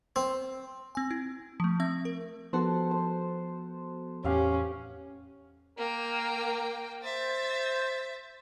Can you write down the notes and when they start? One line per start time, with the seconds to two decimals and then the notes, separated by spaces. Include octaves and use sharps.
0.16 C4
0.95 C4 G#5
1.11 E4
1.60 F3 A3
1.80 C4 E5
2.05 A#4
2.53 F3 B3 F#4 A4 C5
2.91 C5
4.24 E2 A2 C#4 G4 F5 F#5
5.78 A#3 A#4 G5
7.03 C5 E5 A6